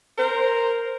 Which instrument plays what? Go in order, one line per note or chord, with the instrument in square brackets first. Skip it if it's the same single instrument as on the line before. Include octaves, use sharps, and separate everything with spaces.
[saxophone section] A#4 C5